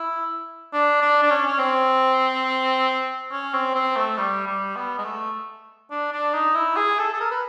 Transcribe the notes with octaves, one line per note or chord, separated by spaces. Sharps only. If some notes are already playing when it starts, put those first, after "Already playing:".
Already playing: E4
D4
D4
D4
C#4
C#4
C4
C#4
C4
C4
A3
G3
G3
B3
G#3
A3
D4
D4
D#4
E4
G#4
A4
A4
A#4
B4